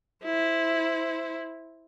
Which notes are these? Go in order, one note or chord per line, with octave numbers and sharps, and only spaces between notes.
E4 C5